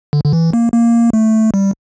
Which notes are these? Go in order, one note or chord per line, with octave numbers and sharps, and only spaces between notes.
D3
D3
E3
A#3
A#3
A3
G3